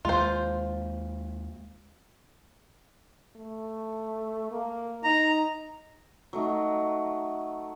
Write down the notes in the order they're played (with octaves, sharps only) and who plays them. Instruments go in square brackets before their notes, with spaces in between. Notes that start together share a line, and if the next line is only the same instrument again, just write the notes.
[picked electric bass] D#2 G#3 A#3 [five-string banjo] F4 C5
[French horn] A3
A#3
[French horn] D#4 [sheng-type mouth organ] A#5
[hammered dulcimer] F#3 A3 D#4